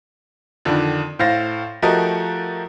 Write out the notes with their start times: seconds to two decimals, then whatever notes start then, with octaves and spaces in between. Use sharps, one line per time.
0.65 F2 D3 D#3 D4
1.19 A2 C5 F5 A6 A#6
1.82 F3 A3 F#4 G4 A#4 D#5